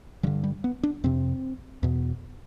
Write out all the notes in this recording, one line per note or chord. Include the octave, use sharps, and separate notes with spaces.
G2 D3 E3
G3
B3
D4
F2 C3 C4
E2 B2